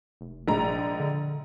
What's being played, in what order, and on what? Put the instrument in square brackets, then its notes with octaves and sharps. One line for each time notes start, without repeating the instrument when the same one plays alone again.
[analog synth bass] F1
[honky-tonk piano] A#1 G#3 A#5
[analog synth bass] D3